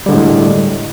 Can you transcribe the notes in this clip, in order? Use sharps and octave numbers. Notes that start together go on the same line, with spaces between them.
A2 D3 G3 G#3